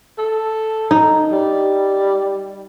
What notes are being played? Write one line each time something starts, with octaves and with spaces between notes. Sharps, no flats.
A4
D#4
G3